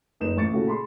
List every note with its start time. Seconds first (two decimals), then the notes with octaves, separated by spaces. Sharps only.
0.20 F#1 D#4 B4 E7
0.37 A1 C#6 A6 C#7
0.52 A#2 C#3 A3 E4 F#4
0.66 G#4 B5 C6